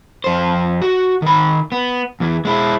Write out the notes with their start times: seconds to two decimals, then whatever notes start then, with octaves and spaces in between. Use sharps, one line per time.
0.24 F2 C5
0.82 F#4
1.22 D#3 B5
1.72 B3
2.20 E2 E3
2.45 G#3 E4